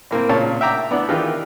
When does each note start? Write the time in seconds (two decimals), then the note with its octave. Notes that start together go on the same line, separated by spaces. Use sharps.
0.11 A2 A#3 C4
0.29 A#2 C#3 C#5 A5
0.61 E5 G5 A#5 D6
0.91 B3 D4 E4 D5
1.08 D#3 E3 D#4 F4 G4 G#4